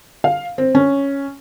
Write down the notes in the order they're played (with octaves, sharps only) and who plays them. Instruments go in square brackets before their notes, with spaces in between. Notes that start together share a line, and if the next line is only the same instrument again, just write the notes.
[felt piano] F5
C4
C#4